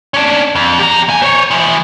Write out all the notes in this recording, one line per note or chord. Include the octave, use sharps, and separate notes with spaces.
C#4 D4
F2
G4 A#5
E2 G#5
C5 C#5
E3 F3